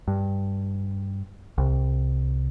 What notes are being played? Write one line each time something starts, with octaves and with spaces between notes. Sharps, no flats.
G2
C2